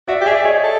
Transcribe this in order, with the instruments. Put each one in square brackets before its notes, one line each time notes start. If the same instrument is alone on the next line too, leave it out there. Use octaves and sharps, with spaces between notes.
[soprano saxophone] F#4 [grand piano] D5 E5
[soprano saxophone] G4
[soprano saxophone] G#4 [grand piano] D5 E5
[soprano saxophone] G#4 [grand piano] C#5 D#5
[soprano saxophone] A4